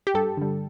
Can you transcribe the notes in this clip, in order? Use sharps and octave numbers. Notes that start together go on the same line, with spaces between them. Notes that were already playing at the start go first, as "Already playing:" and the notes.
G4
G2 A4
D3 G3